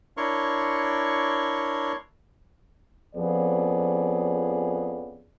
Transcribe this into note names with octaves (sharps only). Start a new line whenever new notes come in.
D4 E4 A#4 C#5 C6 C#6
F2 F3 B3 C#4 G#4 D5